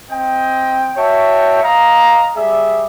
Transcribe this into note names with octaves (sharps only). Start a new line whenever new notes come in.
C4 D#5 G5
F#4 C#5 E5 G5 A5
D#5 F5 A#5
G3 G#4 D5 E5